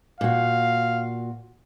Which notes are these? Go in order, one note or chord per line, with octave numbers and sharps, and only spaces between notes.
A#2 F#4 F5